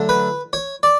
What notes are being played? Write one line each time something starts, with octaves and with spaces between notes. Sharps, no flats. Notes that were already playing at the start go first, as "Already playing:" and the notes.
Already playing: D3 F#3 A3
B4
C#5
D5